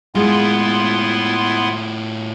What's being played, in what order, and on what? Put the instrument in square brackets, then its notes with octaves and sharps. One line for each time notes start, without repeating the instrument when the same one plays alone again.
[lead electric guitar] A2 F4 [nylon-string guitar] G#3 [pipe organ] B3 E4 C6